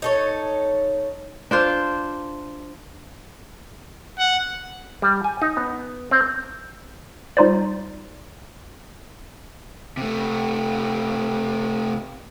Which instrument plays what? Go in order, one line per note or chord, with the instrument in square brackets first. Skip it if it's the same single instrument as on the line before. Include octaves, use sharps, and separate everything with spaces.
[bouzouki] D#4 A4 C#5
[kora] D4 F4 C5
[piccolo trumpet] F#5
[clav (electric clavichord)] G3
G#5
D#4
B3
C4
[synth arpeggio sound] G3 D#4 F4 C5 D5
[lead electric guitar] C3 A3